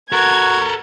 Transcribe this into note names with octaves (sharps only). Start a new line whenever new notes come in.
F#4 A4 A#4 A#5 G#6